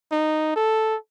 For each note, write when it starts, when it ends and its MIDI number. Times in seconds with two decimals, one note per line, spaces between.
0.12 0.52 63
0.56 0.96 69